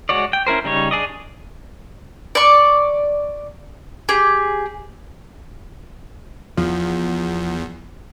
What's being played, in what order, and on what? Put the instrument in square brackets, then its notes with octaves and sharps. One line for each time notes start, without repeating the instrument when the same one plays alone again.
[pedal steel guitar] G#3 F#4 C#5 D5
G5
C#4 E4 A#4 C5
C#3 G3 D#4 C#5
D4 G#4 D5 D#5
[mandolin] D5 C#6
G4 G#4
[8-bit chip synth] E2 [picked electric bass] F3